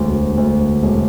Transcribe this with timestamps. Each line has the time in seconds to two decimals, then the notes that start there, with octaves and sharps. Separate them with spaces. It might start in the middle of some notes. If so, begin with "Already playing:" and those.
Already playing: E1 D2
0.38 D2
0.82 E1